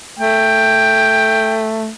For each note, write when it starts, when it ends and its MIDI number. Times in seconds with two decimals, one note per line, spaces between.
0.19 1.90 57
0.19 1.70 79